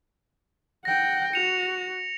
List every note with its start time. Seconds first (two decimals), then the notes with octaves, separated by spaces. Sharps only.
0.85 F#5 G5 A#6
1.33 F#4 C#7 F7